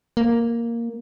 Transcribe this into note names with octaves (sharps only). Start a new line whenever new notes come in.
A#3